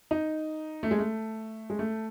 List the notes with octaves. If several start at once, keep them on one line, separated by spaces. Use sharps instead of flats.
D#4
A3
G#3
A3
G#3
A3